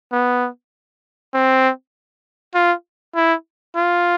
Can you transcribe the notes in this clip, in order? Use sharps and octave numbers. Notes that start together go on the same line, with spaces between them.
B3
C4
F4
E4
F4